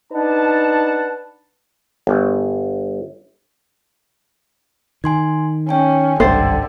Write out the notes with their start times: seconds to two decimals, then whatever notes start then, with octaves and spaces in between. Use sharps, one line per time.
0.13 D4 D#4 B4 F#5 A5
2.07 G1
5.04 D#3 G#5 C6 G#6
5.69 C#4 G5 G#5
6.20 G#1 C#2 G2 D3 C5 E5 G5 A6